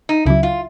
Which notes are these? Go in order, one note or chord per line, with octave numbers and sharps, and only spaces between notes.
D#4
C#2 C#3 F#3 E4
F4